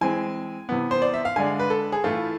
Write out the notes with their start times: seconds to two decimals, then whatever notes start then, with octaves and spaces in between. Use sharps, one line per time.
0.01 E3 G#3 C4 G#5
0.69 C3 E3 B3
0.91 C5
1.02 D5
1.14 E5
1.25 F5
1.36 D3 G#3 D4 G#5
1.59 B4
1.70 A4
1.92 G#4
2.04 A2 E3 A3 F4